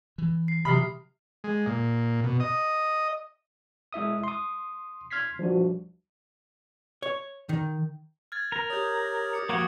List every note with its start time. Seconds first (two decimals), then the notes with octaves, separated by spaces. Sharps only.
0.18 E3
0.48 C7
0.65 C3 E3 F#3 B5 D#6 F6 C7
1.44 G#3
1.66 A#2
2.24 B2
2.40 D#5
3.93 G#3 E4 E5 D#6
4.24 C6 D#6
5.11 C6 F6 G#6 B6 C7
5.39 F3 G3 D4 F#4
7.02 C#5
7.49 D#3
8.32 F6 G#6 A6
8.52 A#4
8.70 G4 C#5 D#6 G6
9.33 D6 C#7
9.49 F3 A#3 F#4 G4 D#6 G#6 C#7